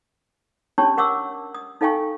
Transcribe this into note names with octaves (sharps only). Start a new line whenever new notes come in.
C#4 D4 G4 C#5 A5 C#6
A#4 F#5 C#6 D6 E6
D#6
D#4 A4 F5 G5 G#5 C#6